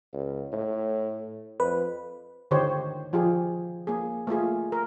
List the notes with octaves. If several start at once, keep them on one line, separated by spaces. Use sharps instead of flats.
C#2
A2
F2 B4
D3 D#3 G4 C5 C#5
F3 F4 G4 G#4
A#3 G#4
A3 A#3 F4 G#4
A#4